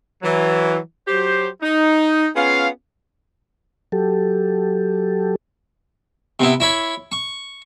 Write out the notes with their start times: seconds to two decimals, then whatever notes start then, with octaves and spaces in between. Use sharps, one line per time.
0.23 E3 F#3
1.08 F#3 G4 C5
1.62 D#4
2.35 B3 C#4 F4 G#4 F5
3.92 F#3 G4 A4
6.40 C3 B3 E4
6.60 E4 C#5 B5
7.12 C#6